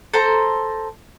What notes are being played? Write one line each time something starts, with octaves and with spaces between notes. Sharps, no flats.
A4 C5 A#5